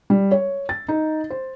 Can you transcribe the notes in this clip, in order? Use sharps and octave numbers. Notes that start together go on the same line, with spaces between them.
G3
C#5
A6
D#4
C5